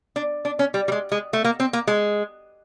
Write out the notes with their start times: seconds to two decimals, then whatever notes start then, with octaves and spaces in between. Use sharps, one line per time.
0.16 D4
0.45 D4
0.59 C#4
0.74 G3
0.88 G3
0.92 G#3
1.12 G#3
1.33 A3
1.44 A#3
1.60 C4
1.73 A#3
1.87 G#3